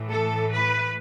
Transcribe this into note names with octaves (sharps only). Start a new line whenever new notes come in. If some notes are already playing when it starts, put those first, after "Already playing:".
Already playing: A2 E3
A4
B4